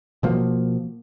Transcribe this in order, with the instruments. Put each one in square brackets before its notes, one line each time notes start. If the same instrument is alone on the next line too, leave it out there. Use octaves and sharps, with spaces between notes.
[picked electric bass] B2 F3 A#3